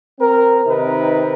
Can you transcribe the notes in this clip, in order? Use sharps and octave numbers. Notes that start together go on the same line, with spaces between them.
C4 A#4
C3 D#3 D#4 A#4 B4